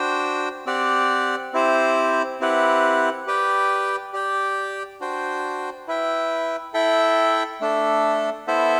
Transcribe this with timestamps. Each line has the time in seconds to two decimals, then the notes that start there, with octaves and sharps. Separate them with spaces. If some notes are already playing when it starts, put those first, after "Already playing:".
Already playing: D4 F#4 C5 G5
0.66 C4 G4 D5 F#5
1.53 C4 E4 G4 C5
2.40 C4 E4 G4 B4 F#5
3.27 G4 B4 D5 G5
4.13 G4 D5 G5
5.01 D4 F#4 C5 G5
5.87 E4 B4 E5 G5
6.74 E4 A4 E5 G5
7.61 A3 D4 A4
8.47 B3 E4 A4 C5 E5